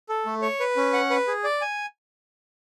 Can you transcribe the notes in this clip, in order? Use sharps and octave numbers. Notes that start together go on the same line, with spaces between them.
A4
A3
C#5
B4
C#4
F#5
B4
G#4
D5
G#5